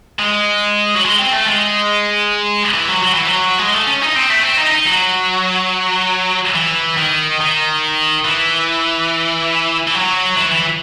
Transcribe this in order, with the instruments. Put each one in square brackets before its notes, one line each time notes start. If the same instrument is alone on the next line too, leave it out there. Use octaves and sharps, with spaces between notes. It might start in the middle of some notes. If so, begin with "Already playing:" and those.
[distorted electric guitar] G#3
F#3
G#3
C4
A3
G#3
E3
F#3
F#3
E3
F#3
G#3
A3
C#4
D#4
C4
A3
C4
D#4
D#4
F#3
E3
D#3
D#3
E3
E3
F#3
E3
E3